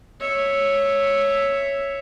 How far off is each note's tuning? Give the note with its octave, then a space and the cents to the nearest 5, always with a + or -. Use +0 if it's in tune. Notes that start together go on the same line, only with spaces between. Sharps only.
C#5 +0 E5 +0